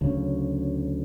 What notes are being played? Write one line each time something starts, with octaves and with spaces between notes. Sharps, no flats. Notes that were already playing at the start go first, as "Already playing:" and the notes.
D2 C#3 F#3 C#4